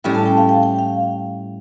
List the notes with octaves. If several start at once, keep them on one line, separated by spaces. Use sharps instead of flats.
A2 G3 C#4 E4 G5
A5
G5
F5
G5
G5
F5